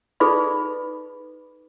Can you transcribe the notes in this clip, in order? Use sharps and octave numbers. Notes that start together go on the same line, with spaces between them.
D#4 G#4 A4 B4 D5 B5